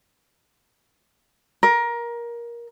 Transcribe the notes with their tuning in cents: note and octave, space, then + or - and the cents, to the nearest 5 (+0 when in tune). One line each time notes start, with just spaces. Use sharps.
A#4 +20